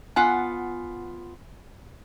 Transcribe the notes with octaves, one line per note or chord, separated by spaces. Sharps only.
B3 F4 F#5 G#5